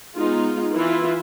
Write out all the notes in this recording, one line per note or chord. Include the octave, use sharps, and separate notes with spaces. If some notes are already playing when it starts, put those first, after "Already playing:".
G#3 B3 D#4 F4
E3 E4 F4